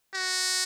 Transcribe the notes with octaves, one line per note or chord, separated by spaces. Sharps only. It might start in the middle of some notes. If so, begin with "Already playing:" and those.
F#4